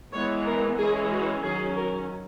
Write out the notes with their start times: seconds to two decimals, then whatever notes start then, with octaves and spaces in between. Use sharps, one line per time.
0.13 E3 G#3 B3 C#5
0.45 A#4
0.78 E3 G#3 C#4 G#4
1.10 F#4
1.43 D#3 F#3 C#4 G#4
1.75 A#4